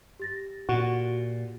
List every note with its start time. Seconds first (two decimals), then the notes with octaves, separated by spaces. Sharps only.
0.20 G4 A6 A#6
0.69 A#2 F#4